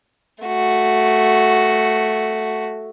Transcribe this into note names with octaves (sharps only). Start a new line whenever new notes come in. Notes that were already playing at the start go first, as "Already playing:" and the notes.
A3 F#4